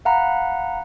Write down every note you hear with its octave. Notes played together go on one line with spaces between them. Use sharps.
F5 F#5 A#5 B5